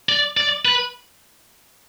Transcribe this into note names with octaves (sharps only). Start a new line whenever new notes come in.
D5
D5
B4